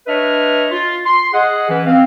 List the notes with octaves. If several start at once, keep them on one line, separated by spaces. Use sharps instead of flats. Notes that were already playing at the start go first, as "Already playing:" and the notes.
D4 B4 C#5 D#5 E5 F6
F4
C6
G#4 D#5 F#5
E3 C#4 B4
C4 F5